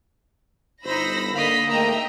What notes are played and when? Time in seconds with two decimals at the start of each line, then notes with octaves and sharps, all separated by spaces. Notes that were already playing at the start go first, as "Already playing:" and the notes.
0.84 G1 D#4 C5 B5 E6 A#6
1.34 D3 A#3 D#5 F5 B5 B6
1.69 G#2 A3 A#3 D#5 E5 G5 A#5 E6